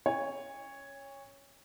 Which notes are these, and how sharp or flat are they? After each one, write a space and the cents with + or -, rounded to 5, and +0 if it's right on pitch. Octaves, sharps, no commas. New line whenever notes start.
C#4 +0 C#5 +0 G#5 -40